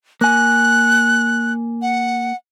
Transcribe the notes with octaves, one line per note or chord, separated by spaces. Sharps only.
A#3 G#5 F#6
F#5